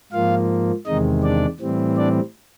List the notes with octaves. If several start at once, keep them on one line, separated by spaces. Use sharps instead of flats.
G#2 F3 A#3 F4 F5
E2 C3 D#3 G#3 D#4 D#5
D4 D5
A2 E3 G3 C4
D4 D5